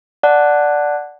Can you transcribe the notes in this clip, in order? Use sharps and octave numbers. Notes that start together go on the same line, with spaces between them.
D5 F#5 A5 F#6